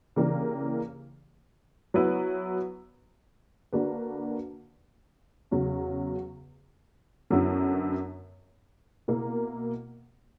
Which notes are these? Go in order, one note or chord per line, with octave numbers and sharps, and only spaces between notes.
C#3 E3 A#3 D4 G4
F#3 B3 E4 B4
D3 A#3 D4 F#4 B4
E2 C#3 F#3
F#2 D3 F#3 B3 E4
B2 A#3 E4 A#4